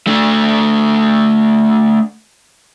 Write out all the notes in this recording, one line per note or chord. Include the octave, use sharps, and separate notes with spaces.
A3 D4